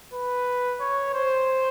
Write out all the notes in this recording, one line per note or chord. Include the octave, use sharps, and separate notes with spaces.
B4
C#5
C5